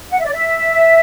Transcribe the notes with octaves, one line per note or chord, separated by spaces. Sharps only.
F#5
E5
D5
E5